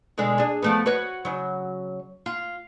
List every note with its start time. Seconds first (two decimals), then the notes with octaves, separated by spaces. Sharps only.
0.18 B2 D3 G#3
0.38 D4 G#4
0.62 F3 A3 B3
0.86 F#4 B4 C#5
1.25 C#3 F#3
2.26 F4